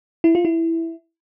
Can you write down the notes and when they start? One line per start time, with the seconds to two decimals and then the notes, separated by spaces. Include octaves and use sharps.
0.24 E4
0.35 F4
0.45 E4